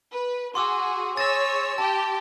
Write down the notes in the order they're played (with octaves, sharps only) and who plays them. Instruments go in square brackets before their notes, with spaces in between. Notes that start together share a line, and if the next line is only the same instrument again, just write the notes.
[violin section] B4
[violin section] F#4 G#4 [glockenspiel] C6 D6 E6
[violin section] G#4 C#5 E6 [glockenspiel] A6 A#6
[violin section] G4 G5 [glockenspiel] A5